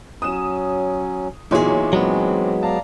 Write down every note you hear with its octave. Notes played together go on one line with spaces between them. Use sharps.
F#3 C#4 D#6 E7
E2 A#2 F#3 D#4 E4 G#4 C#5
F#3 G#3 B3 C4
D5 F5 A5 A#5